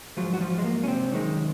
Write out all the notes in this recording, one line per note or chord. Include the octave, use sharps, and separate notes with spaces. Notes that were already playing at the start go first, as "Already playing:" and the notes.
G#2 F3 F#3 F4
F#4
F3 F4
G#3
A#3
C#4
C3 C4
F#2 D#3 G#3